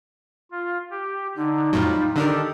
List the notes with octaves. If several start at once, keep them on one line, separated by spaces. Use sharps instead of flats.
F4
G4
D3 D#4
F2 A2 F#3 G3 F4
D3 D#3 D4 G4 A4 A#4